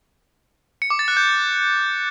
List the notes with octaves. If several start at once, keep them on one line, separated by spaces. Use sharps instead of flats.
C#7
D6
A6
F#6
G6